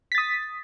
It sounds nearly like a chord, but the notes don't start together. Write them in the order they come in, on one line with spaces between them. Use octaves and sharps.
B6 A6 D#6